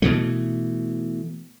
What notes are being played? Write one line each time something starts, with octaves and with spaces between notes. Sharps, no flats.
B2 E3 A3